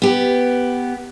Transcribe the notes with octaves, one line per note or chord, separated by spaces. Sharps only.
B3 G4